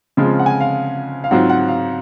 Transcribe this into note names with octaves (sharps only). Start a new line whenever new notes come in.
C#3 F3 G#3 C4 F4
F#5
G#5
F5
F5
G#2 F#3 C4 F4 F#5
F#5
F5